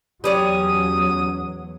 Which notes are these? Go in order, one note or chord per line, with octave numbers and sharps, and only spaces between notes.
E2 F#3 G3 C#4 D5 D#6